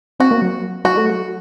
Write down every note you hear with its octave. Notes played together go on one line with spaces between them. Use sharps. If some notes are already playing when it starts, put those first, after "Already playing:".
C4 F#4
A#3
F#3
F#3 F#4
A3
F#3